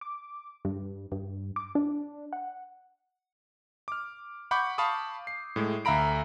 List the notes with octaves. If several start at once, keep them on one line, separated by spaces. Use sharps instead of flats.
D6
G2
G2
D6
D4
F#5
D6 F6
F#5 B5 C#6 D6 G6
F5 A5 B5 C#6 D#6
C7
A2 G#3
D2 E5 F5 A#5 B5 D7